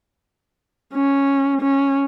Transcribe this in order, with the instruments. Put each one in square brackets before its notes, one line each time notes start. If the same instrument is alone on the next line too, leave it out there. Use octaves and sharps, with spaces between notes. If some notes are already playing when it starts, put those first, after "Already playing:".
[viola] C#4
C#4